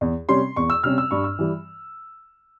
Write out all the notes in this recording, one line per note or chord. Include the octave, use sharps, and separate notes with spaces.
E2
C3 G3 C#4 C6
E2 C#6
E6
C3 G3 C#4 F6
E6
G2 C#6
E6
E3 G3